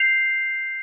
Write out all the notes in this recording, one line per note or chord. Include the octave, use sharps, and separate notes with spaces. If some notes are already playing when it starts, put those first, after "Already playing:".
Already playing: G6 C7 F7